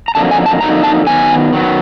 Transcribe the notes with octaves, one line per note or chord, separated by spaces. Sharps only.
A#5
F2 D3 F#3 A#3 D#4 A5
G#5
A5
F2 D3 F#3 A#3 D#4 A#5
A5
D#3 F#3 B3 G#5
D#3 F#3 B3